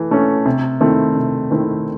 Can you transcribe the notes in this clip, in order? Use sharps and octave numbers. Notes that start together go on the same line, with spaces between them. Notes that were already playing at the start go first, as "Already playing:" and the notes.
Already playing: E3 A3
A3 C#4
C3
D#3 A3 C4 E4
C3
D#3 A3 C4 E4